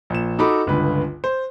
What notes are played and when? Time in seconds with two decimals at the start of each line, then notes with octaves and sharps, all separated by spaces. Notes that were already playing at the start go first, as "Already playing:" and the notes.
0.10 A#1 E7
0.39 D#4 F#4 A4 B5 D6
0.67 G1 C#2 D3 B4 B5
1.24 C5